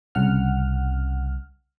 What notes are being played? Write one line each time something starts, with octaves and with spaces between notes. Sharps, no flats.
C2 C#3 F#5 F6